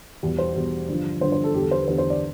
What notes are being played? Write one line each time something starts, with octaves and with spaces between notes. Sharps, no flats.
E2 B2 G3
C5
E2 B2 G3
G2 D3 F3
G2 D3 F3 C5
C5
A4
E2 D3 G3 G4
A4
C5
B4
E2 D3 G3 C5
C5
D5